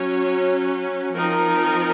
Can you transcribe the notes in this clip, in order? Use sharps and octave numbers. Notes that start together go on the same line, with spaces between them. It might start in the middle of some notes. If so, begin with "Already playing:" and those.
Already playing: F#3 C#4 C#5
F3 C4 D#4 A#4